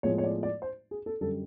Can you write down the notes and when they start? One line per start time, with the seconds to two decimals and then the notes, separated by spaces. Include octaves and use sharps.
0.03 A2 F3 G#3 B3 C#5
0.18 C#5
0.24 D5
0.43 D5
0.62 C5
0.91 G#4
1.06 A4
1.21 F#2 D3 G3 A4